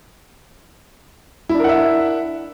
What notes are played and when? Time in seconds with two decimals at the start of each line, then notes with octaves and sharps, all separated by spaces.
1.49 E4
1.54 D4
1.59 A#4
1.64 F#5
1.69 E5